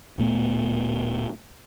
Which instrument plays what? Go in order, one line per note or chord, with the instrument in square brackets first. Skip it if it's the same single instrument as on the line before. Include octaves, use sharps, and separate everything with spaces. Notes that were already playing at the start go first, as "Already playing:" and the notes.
[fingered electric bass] D1 A#2 A3 B3